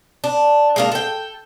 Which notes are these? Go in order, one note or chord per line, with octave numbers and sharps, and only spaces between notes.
D4
G#3 A#3 D4
A4 G5